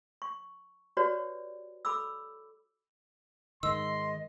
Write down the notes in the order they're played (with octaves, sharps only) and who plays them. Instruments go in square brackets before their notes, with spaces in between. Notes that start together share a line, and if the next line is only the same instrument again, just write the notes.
[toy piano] C#6
F#4 G4 B4 C#5 D5
A4 B5 D6 E6
[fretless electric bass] G#2 D#3 [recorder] D#5 [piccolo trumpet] C6 [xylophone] E6